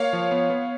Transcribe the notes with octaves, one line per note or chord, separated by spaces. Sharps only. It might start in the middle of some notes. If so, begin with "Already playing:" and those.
Already playing: A#3 C#5 F5
F3
B3
B3